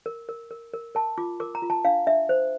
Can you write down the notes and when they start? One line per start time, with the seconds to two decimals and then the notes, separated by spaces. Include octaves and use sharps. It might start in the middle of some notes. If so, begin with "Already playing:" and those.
0.06 A#4
0.29 A#4
0.51 A#4
0.74 A#4
0.95 A#4 A5
1.18 F4 D6
1.40 A#4 D6
1.55 A#5
1.62 F4
1.70 A5
1.85 D4 F5
2.07 D4 E5
2.29 C5